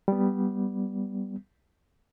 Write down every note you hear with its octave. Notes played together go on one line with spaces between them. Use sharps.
G3 B3